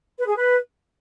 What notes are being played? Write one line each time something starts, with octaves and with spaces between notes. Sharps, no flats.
B4
G#4
B4